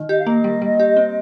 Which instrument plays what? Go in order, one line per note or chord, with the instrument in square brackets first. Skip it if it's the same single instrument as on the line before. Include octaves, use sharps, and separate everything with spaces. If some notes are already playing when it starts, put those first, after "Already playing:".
Already playing: [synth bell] D#3
[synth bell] G4 [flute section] D#5
[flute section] F5
[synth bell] A#3 [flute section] D#5
[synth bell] G3
G3
G4
C4